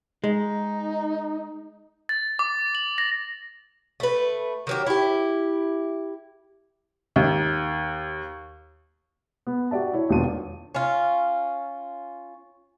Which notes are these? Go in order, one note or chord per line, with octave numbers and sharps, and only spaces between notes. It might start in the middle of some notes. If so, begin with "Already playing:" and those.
G#3 D#4
A6
D6
F#7
A#6
A3 B4
D#3 F#3 G4
E4 G4
D#2
B3
F#4 G4 D5 E5 A5
E4 C#5
E1 D#2 B2 D4 F4 D#7
C#4 F4